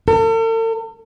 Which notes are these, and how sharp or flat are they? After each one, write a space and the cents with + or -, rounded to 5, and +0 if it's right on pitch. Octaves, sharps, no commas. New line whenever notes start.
A4 +45